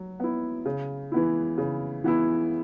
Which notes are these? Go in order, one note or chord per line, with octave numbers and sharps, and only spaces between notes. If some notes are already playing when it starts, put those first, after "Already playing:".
Already playing: F#3
B3 E4
C#3
E3 B3 E4
C#3
E3 B3 E4